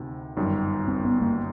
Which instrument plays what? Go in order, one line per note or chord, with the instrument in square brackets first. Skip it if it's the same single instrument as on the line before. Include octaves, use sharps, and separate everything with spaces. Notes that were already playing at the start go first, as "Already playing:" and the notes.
Already playing: [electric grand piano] D2 C3 D#3
G1 F#2 D#3 G3
[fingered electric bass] C4
B3
A#3